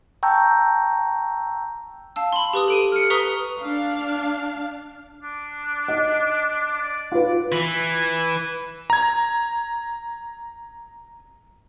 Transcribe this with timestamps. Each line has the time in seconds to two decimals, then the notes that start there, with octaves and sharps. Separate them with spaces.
0.23 G5 A5 A#5 C#6 E6 G6
2.16 F5 A5 E6
2.33 B5 C6
2.53 G4 B4 D#6
2.68 A4 D7 D#7
2.92 F6 C#7
3.10 B4 A#5 C#6 D#6 B6 G7
3.60 D4 F5
5.23 D4
5.88 D#5
6.81 D5
7.12 F4 B4
7.52 E3
8.90 A#5 G#6